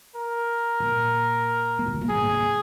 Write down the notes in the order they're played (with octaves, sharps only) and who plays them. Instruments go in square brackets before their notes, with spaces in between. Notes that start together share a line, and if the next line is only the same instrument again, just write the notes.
[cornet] A#4
[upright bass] A#2
E3
C#3
C3
A#2
[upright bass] G#2 [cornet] G#4
[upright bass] C3